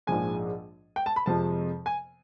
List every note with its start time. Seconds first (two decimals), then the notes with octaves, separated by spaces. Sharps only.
0.07 A#1 G#2 F3 G#3 G#5
0.96 G5
1.06 A5
1.16 B5
1.26 F2 C3 F3 G#3 A5
1.86 G#5